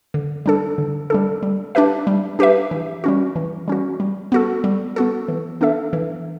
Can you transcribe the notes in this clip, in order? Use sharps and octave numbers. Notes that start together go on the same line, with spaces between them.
D3
G3 D4 A4
D3
G3 D4 A4
G3
D4 G4 B4 E5
G3
D4 G4 B4 E5
E3
G3 C#4 F#4
E3
G3 C#4 F#4
G3
B3 F#4 A4
G3
B3 F#4 A4
E3
B3 D4 A4 E5
E3